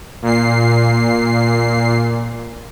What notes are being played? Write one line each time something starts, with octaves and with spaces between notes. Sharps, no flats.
A#2 C7